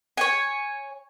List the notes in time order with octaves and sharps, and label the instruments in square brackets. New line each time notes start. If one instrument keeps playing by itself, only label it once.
[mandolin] C#5 G#5